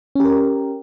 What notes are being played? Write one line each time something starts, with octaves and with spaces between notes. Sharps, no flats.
C#4 G4 A#4